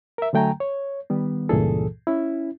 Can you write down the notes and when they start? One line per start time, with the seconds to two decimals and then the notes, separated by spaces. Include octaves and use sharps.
0.18 A#4 E5
0.33 D3 F#3 A3 G5 G#5 A#5
0.60 C#5
1.10 D#3 G3 B3
1.49 C#2 G2 A#2 E3 G#4 A4
2.07 C#4 E4